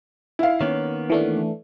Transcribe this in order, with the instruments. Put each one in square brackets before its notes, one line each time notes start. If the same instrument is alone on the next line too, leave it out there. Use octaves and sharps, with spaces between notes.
[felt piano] E4 F5
[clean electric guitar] D#3 A#3 B3 [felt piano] C#4
[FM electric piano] E3 A3 D4